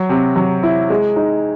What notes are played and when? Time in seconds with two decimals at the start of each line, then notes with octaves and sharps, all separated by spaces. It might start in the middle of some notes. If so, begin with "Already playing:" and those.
Already playing: F#3
0.09 C3
0.36 F#3
0.63 E4
0.90 G#3
1.16 D#4